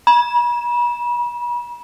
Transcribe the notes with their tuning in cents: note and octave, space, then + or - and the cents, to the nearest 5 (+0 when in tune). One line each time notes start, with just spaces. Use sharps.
B5 -45